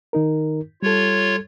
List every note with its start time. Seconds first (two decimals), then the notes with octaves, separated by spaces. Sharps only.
0.13 D#3 D#4 A#4
0.83 G3 F4 A4 C#5